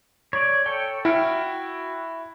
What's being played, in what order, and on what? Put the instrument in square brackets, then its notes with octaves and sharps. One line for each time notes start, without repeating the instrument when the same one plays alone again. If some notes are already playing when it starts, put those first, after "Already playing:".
[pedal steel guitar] C#5 D5
A4 C#5 G5
[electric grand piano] E4 [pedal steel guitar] F#4 G5 F6